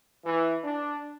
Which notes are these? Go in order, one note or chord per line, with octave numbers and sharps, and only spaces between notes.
E3
D4